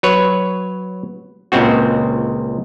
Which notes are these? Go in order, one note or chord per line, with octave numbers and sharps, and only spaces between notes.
F#3 B4 C#5
C#2 A#2 C#3 G#3 C4 F#4